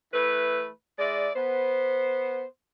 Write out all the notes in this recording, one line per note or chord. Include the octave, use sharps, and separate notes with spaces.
E3 A3 B4
G#3 E4 D5
B3 C5